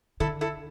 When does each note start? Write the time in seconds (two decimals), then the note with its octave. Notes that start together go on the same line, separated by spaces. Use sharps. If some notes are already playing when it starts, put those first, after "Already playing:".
0.20 D3 E4 A4
0.41 E4 A4